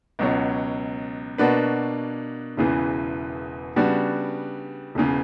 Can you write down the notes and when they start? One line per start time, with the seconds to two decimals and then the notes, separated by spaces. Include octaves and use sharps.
0.19 C#2 B2 F#3 C#4
1.38 B2 A#3 D4 F#4 B4
2.57 E1 E2 C#3 E3
3.76 C#3 G3 B3 D4 F#4
4.95 E1 E2 C#3